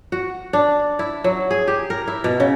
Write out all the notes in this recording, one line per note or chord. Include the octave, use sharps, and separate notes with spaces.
F#4
D4
E4
F#3
G#4
G4
A#4
E4
B2
C#3